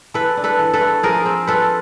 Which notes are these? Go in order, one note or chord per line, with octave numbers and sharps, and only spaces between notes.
E3 A4 B4
D4
A4 B4
E3
A4 B4
A3
F3 G#4 A#4
C4
F4 A4 B4